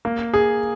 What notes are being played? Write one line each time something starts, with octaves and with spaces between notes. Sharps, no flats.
A#3
G#4